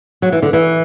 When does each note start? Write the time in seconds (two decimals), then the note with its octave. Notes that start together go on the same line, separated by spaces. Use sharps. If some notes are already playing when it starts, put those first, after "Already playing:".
0.22 F#3
0.32 E3
0.42 D3
0.53 E3